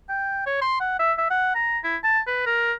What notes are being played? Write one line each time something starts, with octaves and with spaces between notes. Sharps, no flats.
G5
C#5
C6
F#5
E5
E5
F#5
A#5
E4
A5
B4
A#4